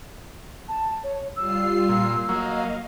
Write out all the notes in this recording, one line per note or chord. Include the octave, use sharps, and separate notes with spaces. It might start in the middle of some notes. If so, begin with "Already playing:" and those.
A5
C#5
G3 F4 E6 C7
A#2
F#3 A#3 D#5 F5